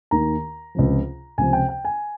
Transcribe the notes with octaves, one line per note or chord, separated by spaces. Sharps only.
D#2 D#3 A#5
C#2 C3 F3
C#2 C3 F3 G#5
G5
G5
G#5